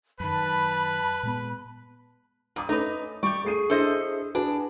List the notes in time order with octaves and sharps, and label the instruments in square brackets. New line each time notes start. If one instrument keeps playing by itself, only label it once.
[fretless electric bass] F#2 D#3 [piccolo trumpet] B4 [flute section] A5 [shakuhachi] B5
[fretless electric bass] A#2 G#3 B3
[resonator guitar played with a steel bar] G2 [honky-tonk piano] A#5 D6 D#6
[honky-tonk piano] A3 C#4 [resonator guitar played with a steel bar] D#4 B4
[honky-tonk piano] G3 [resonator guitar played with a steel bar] G4 D5 [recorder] C#6
[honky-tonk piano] A3 C7 D#7 [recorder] G#4
[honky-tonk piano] D4 E4 [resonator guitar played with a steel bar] A4 C5 D#5
[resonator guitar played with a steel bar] D4 [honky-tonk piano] F#4 G#4 B4